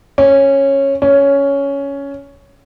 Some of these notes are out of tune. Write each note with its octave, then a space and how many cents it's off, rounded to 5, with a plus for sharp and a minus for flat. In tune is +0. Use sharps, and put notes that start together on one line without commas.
C#4 -10
C#4 +10